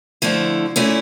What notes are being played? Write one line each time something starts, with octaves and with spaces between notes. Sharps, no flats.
D3 F3 A3 E4
A#2 A3 C#4 E4